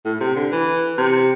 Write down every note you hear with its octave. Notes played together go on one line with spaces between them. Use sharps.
A2
C3
D3
E3
C3